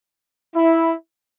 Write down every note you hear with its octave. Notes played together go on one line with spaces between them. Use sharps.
E4